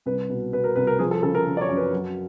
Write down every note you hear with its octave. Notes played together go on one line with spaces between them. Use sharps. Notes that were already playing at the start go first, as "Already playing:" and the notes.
C2 B4
B2
B2 B4
A#4
C2 B4
A#4
F3 G#4
A4
C#3 A4
A#4
C#3
D5
C#5
F#2
B4
F#3